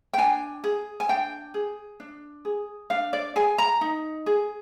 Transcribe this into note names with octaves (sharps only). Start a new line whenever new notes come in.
G5
D4 G#5
G#4
G#5
D4 G5
G#4
D4
G#4
D4 F5
D5
G#4 G#5
A#5
D#4
G#4